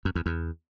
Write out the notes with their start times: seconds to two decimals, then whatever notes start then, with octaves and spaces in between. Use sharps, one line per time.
0.05 F#2
0.15 E2
0.26 E2